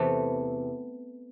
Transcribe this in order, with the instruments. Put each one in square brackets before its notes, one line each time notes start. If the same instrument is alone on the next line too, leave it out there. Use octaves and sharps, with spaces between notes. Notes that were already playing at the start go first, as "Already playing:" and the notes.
Already playing: [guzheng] E2 C3 E3 A3